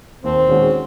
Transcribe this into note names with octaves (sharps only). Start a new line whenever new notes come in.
D#2 C4
D#3 G#3 C#4 F#4